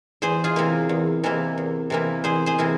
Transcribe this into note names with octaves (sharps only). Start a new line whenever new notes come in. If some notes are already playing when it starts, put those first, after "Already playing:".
E2 G#4 C5
F4 G#4
C3 E3 A#3 E4
E2
C3 E3 A#3 E4
E2
C3 E3 A#3 E4
E2 G#4 C5
G#4 C5
C3 E3 A#3 E4